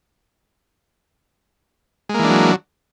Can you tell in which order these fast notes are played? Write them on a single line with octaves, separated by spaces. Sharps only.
G#3 A#3 E3 D4 F#3